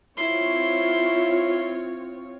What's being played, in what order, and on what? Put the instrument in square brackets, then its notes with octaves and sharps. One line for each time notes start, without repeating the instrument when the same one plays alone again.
[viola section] C4 F4 C#5 [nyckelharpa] E4 C6